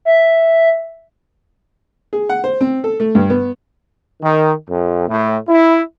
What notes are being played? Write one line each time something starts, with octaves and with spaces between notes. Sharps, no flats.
E5
G#4
F#5
C5
C4
A4
A3
G2
B3
D#3
F2
A2
E4